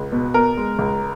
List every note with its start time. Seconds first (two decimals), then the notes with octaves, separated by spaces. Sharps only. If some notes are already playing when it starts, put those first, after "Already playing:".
Already playing: C#2
0.12 B2
0.34 B3 A#4
0.57 G#3
0.79 C#2